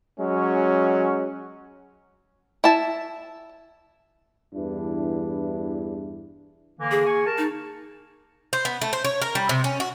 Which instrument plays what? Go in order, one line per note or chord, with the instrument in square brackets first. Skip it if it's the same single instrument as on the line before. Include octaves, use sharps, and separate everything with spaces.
[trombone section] F#3 G#3 C#4
[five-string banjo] E4 A5
[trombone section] E2 G2 E3 D4 E4
[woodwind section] D3 E3 A#3
[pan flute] G#4
[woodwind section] A#3 G#5 C#6
A#4 A5
[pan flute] D#4
[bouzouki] C5
B3
A3
C5
C#5
A#4
G3
C3
C#4
F#4